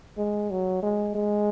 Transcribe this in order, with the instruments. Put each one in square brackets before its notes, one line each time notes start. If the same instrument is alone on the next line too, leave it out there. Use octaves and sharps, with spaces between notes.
[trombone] G#3
F#3
G#3
G#3